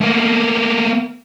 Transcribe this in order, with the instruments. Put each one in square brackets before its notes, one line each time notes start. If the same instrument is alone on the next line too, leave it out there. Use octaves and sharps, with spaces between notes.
[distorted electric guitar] A3 A#3